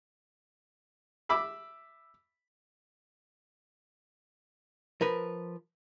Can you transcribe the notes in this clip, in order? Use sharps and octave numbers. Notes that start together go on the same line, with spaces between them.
E5 B5 D6 E6
F3 A#4 B4